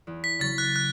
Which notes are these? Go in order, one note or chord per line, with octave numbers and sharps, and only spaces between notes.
E2
B6
C#3 F#3 C#4 A6
F#6
F#6